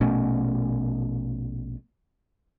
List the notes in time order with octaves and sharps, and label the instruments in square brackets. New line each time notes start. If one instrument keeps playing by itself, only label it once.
[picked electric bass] A#1 B2 A3 C#4